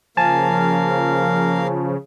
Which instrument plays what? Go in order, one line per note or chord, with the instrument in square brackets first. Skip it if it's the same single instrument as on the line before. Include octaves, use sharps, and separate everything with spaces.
[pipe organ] C#3 [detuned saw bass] F3 [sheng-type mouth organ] A#3 A#4 F5 [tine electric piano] G#5 A5